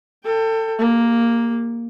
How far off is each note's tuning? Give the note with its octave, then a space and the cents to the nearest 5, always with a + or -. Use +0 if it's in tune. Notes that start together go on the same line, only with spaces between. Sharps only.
A4 +25 G5 +20
A#3 +0 G4 +45